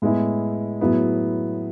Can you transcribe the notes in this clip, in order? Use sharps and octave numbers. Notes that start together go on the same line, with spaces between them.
A2 G#3 B3 E4
A2 F#3 B3 E4 G#4